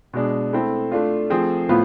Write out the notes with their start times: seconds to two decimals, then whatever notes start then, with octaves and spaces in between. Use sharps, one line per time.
0.13 B2 G#3 D4
0.53 A3 C4 E4 A4
0.92 A3 D4 F4
1.30 F3 A3 C4 G#4
1.69 A2 F3 B3 F4